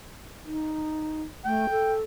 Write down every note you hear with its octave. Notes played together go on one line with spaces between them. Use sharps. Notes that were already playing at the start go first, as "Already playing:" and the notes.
D#4
A3 G5
A4